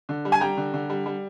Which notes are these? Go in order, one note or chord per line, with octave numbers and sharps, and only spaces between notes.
D3
G3
G#5
G3 G5 A#5
D3
D3
G3
G3